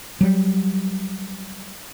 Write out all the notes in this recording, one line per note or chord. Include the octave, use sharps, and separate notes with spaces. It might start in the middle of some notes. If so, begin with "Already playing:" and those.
F#3 G3